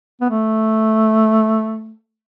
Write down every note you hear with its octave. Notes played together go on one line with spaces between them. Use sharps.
B3
A3